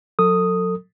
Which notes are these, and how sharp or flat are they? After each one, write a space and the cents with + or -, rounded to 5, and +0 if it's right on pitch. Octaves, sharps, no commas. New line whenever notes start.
F#3 -35 A4 +30 D#6 +0